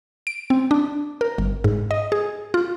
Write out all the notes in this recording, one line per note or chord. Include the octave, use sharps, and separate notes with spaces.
D7
C4
D4
A#4
G1
G#2
D#5
G#4
F4